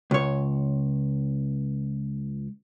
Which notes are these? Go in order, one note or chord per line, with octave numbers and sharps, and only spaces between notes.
C#2 C#5